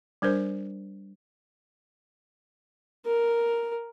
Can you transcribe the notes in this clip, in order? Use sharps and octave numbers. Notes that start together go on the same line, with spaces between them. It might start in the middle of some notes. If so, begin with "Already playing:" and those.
G3 D4 A#4 C5
A#4